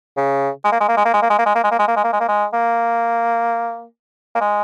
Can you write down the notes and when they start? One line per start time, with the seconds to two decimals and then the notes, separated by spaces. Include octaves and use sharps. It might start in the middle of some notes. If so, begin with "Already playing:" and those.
0.17 C#3
0.64 G#3
0.72 A#3
0.80 G#3
0.88 A#3
0.97 G#3
1.05 A#3
1.14 G#3
1.22 A#3
1.30 G#3
1.38 A#3
1.46 G#3
1.55 A#3
1.64 G#3
1.71 A#3
1.79 G#3
1.88 A#3
1.96 G#3
2.04 A#3
2.13 G#3
2.20 A#3
2.28 G#3
2.53 A#3
4.35 A#3
4.41 G#3